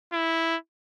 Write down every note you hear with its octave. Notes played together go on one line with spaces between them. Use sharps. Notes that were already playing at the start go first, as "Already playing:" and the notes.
E4